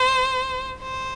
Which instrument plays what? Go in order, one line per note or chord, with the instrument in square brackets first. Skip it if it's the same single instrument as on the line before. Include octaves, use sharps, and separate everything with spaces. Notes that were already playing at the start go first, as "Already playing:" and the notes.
Already playing: [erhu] C5
C5